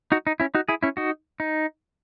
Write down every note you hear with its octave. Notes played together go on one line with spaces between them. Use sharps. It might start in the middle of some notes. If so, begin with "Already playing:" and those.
D#4 F#4
D#4
C#4 E4
D#4 F#4
E4 G#4
C#4 E4
D#4 F#4
D#4